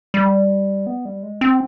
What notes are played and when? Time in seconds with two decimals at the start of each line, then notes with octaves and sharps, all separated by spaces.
0.14 G3
0.87 B3
1.05 G3
1.23 G#3
1.41 C4